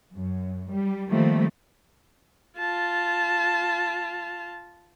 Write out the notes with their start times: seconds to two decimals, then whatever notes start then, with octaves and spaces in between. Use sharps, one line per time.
0.16 F#2
0.71 G3
1.11 D#3 F3 G3 A3 A#3 C4
2.58 F4 A5